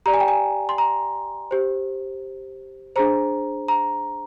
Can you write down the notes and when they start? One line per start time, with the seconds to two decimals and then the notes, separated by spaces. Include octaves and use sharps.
0.06 G4 D5 A#5
0.14 G#5
0.20 G5
0.28 G#5
0.69 C6
0.78 A#5
1.51 G4 C5
2.96 D4 G#4 C5 A#5
3.68 A#5